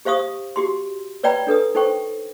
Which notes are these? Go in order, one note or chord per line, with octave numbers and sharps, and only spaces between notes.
G4 C5 F5 C#6 D#6
F#4 G4 C6
B4 C#5 D5 G5 A#5 B5
D4 A4 B4 D#6
D#4 A4 C5 G5 C#6